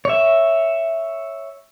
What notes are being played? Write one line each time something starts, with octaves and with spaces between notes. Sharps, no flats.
C#5 E5